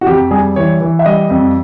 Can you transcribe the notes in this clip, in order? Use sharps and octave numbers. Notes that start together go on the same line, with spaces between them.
F#4
F2 G4
G3 G#4
E3 C#5
E3
E5
G3 D#5
F2